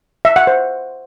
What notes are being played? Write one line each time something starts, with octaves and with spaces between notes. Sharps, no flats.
E5
F#5
C5